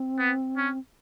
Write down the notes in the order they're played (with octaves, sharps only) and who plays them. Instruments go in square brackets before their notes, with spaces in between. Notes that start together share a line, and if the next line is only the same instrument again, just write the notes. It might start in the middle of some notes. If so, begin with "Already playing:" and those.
Already playing: [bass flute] C4
[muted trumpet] B3
C#4